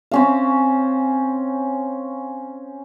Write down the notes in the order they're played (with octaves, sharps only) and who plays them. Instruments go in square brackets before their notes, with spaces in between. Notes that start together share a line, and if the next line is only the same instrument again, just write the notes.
[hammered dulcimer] C4 C#4 F5